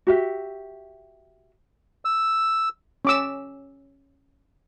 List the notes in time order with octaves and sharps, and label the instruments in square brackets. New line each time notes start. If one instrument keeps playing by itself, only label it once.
[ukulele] F#4 G4 E5
[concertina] E6
[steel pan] C#4 D6 E6